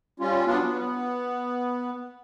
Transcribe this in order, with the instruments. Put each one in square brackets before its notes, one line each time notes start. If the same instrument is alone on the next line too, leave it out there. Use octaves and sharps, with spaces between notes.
[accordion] G3 C#4 F4
F#3 B3 D4 F4
B3